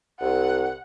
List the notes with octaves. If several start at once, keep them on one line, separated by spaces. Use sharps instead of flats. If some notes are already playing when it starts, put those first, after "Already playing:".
C2 F#5